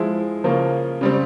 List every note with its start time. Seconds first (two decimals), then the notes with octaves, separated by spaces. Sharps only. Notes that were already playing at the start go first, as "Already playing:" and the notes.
Already playing: F3 G#3 E4
0.44 C#3 F3 A#3 C#4
1.01 C#3 G3 C4